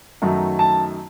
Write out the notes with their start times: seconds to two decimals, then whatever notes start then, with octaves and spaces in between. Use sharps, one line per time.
0.22 F#2 D#3 F#3 A3 D#4
0.59 A5